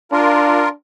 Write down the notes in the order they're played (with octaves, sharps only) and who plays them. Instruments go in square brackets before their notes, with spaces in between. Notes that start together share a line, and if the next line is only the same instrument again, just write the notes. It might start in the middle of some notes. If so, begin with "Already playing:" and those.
[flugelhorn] D4 [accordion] F4 A#4